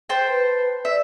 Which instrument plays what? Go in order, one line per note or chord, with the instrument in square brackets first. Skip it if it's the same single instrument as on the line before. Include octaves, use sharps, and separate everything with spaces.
[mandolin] C5 G5 A5
[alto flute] B4
[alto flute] D5 [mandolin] E5